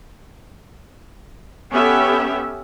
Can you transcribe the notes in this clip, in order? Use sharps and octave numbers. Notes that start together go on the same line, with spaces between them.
B3 C#4 G4 A4 E5